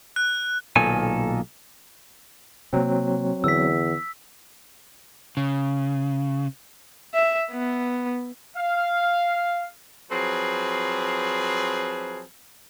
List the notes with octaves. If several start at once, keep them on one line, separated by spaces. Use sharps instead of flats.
F#6
B1 A#2 D#3 A4 G#5
C3 F#3 A#3 C4
E2 D3 E6 B6
C#3
E5
B3
F5
F3 F#3 C4 G#4 B4